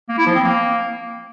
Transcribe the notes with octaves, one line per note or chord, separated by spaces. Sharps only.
A#3
E4
F3
C4
A#3